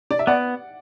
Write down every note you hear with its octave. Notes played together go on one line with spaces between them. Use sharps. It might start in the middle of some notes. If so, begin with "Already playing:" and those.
D5
E5
B3 D5 F#5